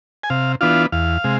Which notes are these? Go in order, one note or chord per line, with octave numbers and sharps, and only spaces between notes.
G#5
C3 F5
E3 B3 D4 F4 F5
E2 F5
C3 G#3